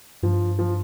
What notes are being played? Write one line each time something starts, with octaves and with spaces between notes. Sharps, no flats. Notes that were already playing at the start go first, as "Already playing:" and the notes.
G2 F3
F3